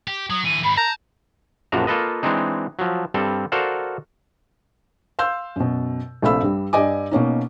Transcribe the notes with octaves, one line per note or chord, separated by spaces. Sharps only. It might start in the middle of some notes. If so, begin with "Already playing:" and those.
G4
F#3 D#6
D3 E3 D#7
G#2 D#3 B5
A5 A#5 G6
A#1 F#2 F3 D4 F#4 A#5
A#3 F4 A4 B4 D#5
E3 G#3 C4 D4 D#4
F3 F#3
G2 G3 C4 A4
F#4 A4 A#4 C5 D5 F5
F5 C6 E6 G6
F#2 B2
A#1 C3 A3 F5 B5 E6
G2 G3
G2 G4 D5 D#5 G#5 D6
B2 A#3 C#4 D#4